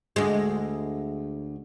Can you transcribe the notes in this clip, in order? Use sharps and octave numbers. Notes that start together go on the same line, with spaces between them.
D2 G#3